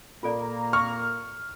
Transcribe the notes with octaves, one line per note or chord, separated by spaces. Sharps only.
A#2 A#3 F4 A4 D5 A#5
C#6 F6